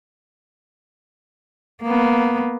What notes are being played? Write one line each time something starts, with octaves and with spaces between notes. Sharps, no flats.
A#3 B3